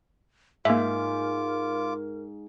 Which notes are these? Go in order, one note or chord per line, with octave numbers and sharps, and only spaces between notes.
G#2 A#3 F4 A#4 E5 D6